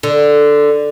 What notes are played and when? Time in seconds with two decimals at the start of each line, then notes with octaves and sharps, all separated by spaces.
0.03 D3